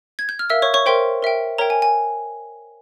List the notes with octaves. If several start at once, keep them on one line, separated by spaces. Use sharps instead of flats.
G#6
G6
F6
A#4 E5 F5 E6
C#5 C#6
C#5 C#6
A#4 C5 E5 G5 C6
A#4 E5 G5
A#4 C#5 E5 G5 A#5
G#5
G#5